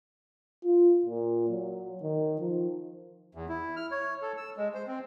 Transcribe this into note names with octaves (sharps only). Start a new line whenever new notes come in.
F4
A#2
F#3
D#3
F3
E2
E4
F6
C#5
A4
E6
G#3
C5
C4